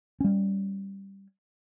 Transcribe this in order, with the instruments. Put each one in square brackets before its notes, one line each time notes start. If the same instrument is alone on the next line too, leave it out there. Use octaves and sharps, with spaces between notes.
[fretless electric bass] G3 C#4